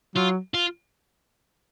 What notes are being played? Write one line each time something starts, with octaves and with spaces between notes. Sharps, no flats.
F#3 F4
F4